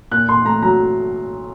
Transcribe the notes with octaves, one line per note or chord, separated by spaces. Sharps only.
A#2 F#6
A#2 C6
A3 A#5
F#3 A#5